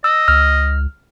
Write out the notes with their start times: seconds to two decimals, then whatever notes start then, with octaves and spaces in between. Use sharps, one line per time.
0.04 D#5 E6
0.28 C#2 F6